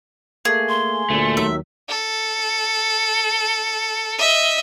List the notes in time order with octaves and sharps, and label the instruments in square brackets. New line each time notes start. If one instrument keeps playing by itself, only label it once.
[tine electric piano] A3 A#3 [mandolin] G#4
[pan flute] C6
[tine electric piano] D2 A#2 [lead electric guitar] A3
[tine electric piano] D#2 D#3 F#3 [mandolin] E5
[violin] A4
D#5 E5